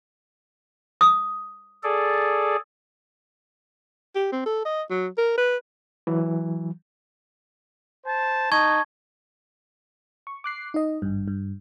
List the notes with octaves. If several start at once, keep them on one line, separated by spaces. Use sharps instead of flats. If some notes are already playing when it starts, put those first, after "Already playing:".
D#6
G#4 A4 D5
G4
C4
A4
D#5
F#3
A#4
B4
E3 F#3
C5 A5
D#4 A5 C#6 G#6
C#6
D6 F#6 C7
D#4 D#5
G#1 G2
G2